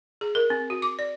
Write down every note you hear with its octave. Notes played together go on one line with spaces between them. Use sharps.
G#4
A#4
C4
F#4
D6
D5